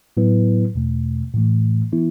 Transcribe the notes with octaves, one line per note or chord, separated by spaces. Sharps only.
A2 F#3 B3 E4 B4
E2 B2 A3
A2 E3 A3
E3 B3 E4